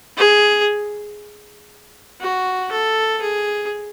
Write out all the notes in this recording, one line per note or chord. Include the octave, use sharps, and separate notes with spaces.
G#4
F#4
A4
G#4